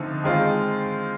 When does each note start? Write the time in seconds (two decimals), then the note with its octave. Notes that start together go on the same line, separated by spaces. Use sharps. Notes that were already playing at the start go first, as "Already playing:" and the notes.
Already playing: D3 F3 A3 C4 D#4
0.24 D#3 G#3 C4 F4